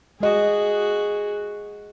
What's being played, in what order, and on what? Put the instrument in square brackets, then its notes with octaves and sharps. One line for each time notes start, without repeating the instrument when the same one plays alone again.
[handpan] G#3 D#5 [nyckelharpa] F#4 G#4